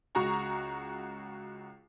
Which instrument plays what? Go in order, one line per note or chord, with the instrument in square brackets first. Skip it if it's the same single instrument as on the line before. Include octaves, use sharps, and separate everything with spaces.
[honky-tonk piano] C#2 F#4 A#5 C#6